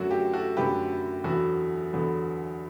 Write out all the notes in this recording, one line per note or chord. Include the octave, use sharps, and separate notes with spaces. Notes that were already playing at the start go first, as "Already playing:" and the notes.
Already playing: F#2 D3 F#3 A3 F#4
G4
F#4 A4
F#2 D3 F#3 A3 G4 B4
E2 D3 F#3 B3 F#4 A4
E2 D3 F#3 B3